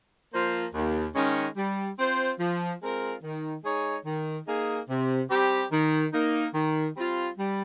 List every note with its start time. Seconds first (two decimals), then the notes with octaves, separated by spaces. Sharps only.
0.33 F3 A#3 F4 C5
0.74 D#2
1.15 D#3 G#3 C#4
1.56 G3
1.99 C4 F4 C5
2.40 F3
2.81 G#3 C4 F4 A#4
3.23 D#3
3.64 G#3 D#4 G#4 C#5
4.05 D#3
4.47 A#3 D#4 G#4
4.89 C3
5.30 G3 C4 G4
5.72 D#3
6.13 A#3 D#4
6.54 D#3
6.96 G3 C4 F4
7.38 G3